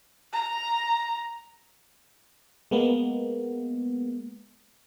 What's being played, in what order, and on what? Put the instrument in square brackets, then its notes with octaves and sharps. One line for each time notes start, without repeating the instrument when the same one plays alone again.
[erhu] A#5
[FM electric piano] G#3 A#3 B3